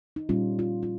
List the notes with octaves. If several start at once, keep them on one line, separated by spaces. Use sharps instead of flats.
D#4
A#2 G3 C#4 F4
F4
F4